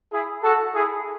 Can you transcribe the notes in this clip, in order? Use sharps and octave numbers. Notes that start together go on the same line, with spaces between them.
E4 G#4
F#4 A4
E4 G#4